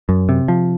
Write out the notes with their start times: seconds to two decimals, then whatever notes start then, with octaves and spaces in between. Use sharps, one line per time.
0.09 F#2
0.29 C3
0.48 F3